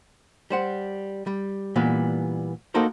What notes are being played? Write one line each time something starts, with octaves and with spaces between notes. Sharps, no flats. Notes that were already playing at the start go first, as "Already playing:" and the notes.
G3 C5 F#5
G3
A#2 E3 G3 B3
A#3 D#4 F#4 A4 A#4 C5